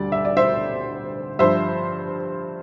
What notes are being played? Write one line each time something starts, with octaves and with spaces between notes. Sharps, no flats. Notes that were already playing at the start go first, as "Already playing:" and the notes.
Already playing: D2 D3 G3 D5
E5
D5
C5 E5
G2 F3 C5 E5